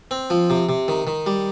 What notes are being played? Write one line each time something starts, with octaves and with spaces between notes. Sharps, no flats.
C4
F3
C3
C3
D#3
D#3
G3